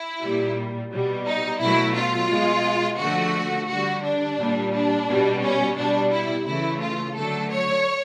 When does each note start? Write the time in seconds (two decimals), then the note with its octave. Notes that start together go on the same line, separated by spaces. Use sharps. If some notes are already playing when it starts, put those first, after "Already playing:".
Already playing: E4
0.21 A#2 G3
0.91 B2 G3
1.26 D#4
1.60 B2 F#3 A3 E4
1.95 F4
2.30 B2 G#3
2.99 D3 F3 A3 F#4
3.68 D3 G3 F#4
4.03 D4
4.38 A#2 G3
4.72 D4
5.07 B2 G3
5.42 C#4
5.76 B2 G3 D4
6.11 E4
6.46 C#3 E3 A3 E4
6.80 F4
7.15 D3 F#3 A3 A4
7.50 C#5